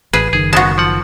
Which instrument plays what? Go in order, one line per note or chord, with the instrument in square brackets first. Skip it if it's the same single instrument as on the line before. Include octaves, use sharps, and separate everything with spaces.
[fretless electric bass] A1 [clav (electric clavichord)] G#4 [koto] B4
[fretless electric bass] F#1 D#3 [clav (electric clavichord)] G#4
[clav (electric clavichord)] G#3 B3 [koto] F#4 A5
[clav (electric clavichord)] F3 F#5